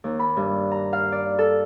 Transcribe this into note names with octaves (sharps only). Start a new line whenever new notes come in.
D#2
B5
G2
A#5
F5
D5
A4